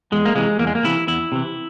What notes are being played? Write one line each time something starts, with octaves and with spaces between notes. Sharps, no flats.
E2 G#3
A#3
C3 E3 G#3
E2 A#3
G#3
A#3
C3 E3 E4
E2 E4
C3 E3